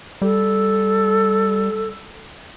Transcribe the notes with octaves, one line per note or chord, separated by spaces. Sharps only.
G3 A4